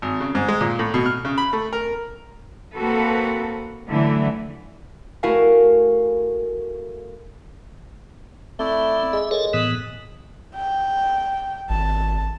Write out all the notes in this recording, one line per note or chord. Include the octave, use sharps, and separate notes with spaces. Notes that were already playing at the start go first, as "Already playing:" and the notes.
G#1
C#3
G#2
G#3
A#2
A2
B2
F6
C#3
B5
A3
A#4
A#3 C4 F#4 A4 B4
D3 E3 F#3 A3 E4
A3 E4 F#4 A#4 F5 G#5
A3 C4 E4 D5
G#3 E5
G#3 A4 A#4 C#5
A2 E3 B3 D#6 F#6
G5
G#1 A5